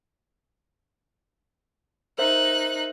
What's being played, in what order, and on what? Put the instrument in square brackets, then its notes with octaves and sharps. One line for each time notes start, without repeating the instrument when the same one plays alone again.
[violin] D#4 F#6 [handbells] A#4 C5 E5